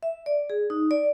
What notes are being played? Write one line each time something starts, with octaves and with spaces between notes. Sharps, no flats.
E5
D5
G#4
D#4
D5